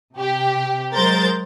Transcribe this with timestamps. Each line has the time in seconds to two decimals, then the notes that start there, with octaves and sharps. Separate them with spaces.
0.14 C3 G4
0.94 F#3 G#3 A#4 C5 G6 A6